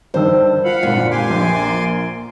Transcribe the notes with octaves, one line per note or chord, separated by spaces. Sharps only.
G2 D#3 C5 E6
F4 F5 F#5 B5
G#1 A#2 D3
G4 G#5 C6 D6
A#1
A#3